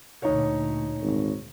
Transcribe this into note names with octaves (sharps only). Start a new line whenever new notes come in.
D2 A#2 D#4 C#5
G#1